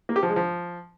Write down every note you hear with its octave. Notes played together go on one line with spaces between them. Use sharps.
A#3
G4
F3
G#3
F3